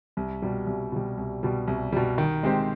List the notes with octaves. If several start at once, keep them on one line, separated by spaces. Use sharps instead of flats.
C2
B2 G3
C2
B2 G3
C2
B2 G3
C2
B2 G3
D#3
G#3 C4 G4 C5